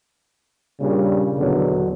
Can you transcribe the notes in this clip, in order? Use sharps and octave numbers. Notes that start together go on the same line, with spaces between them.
A#2 C#3 G3 D4
E2 B2 D3 F#3